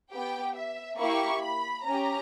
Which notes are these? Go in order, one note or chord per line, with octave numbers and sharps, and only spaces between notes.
B3 G4 G5
E5
A#3 E4 G4 C#6
B5
C#4 A#5
G4